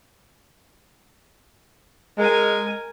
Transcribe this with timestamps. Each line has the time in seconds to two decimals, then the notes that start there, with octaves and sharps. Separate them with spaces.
2.18 G#3 A#4 G#5